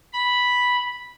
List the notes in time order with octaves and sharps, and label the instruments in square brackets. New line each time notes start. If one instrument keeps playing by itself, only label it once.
[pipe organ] B5